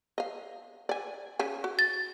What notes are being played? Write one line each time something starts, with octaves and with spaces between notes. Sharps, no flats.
D#5 F5
D5 G#5
C#3 G#5
F#4
A6